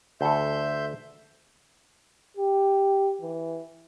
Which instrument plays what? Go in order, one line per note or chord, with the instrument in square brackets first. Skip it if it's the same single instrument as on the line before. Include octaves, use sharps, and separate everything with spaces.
[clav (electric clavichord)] D2 A4 [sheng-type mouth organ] E5 C6 G6
[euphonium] G4
E3